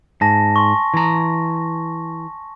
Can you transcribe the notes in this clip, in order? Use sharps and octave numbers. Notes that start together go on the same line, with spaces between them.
G#2 G#5 A5 A#6
G#5 C6 C#6
E3 A#5